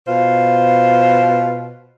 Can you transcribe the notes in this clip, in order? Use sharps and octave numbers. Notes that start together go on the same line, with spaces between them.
B2 F4 C5